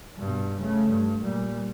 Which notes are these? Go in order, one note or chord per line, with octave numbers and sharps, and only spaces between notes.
G2 B2
C#3 A3
G2
A#2 G3